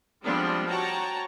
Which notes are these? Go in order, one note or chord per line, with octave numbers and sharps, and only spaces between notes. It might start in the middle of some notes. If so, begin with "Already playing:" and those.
F3 G3 G#3 B3 C4 D4
F#4 C#5 G5 A5 A#5